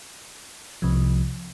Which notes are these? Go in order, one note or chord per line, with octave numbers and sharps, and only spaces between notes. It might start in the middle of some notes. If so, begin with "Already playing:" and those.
C2 C3 F3